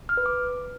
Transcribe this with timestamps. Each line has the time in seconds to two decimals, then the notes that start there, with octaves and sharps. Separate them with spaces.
0.09 F6
0.17 B4
0.26 D6